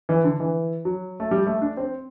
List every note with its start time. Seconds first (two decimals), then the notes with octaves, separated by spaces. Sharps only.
0.09 E3
0.24 D3
0.40 E3
0.85 F#3
1.20 A3
1.31 G3
1.47 A3
1.62 D4
1.77 C4